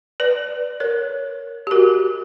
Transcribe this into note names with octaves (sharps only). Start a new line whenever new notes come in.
B4 D5
A#4 C#5
G4
F#4 A#4